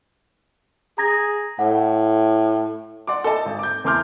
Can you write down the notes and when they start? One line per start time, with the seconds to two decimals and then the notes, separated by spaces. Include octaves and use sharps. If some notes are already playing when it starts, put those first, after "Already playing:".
0.98 G#4 A#5 G#6 A#6
1.59 A2 F#5
3.07 D5 F#5 C6 D6
3.24 A4 D#5 E5 A5
3.45 G#1
3.59 D6 G6
3.84 E2 A3 C6 D6 F6 G6